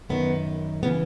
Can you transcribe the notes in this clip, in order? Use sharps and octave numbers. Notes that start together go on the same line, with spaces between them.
F#2 D#3 B3
C#3 E3 B3